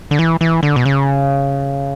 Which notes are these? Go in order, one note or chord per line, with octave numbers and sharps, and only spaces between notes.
D3
E3
E3
D3
B2
C#3